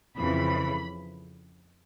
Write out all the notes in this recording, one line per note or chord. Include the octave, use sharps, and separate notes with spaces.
F2 C#3 E3 B5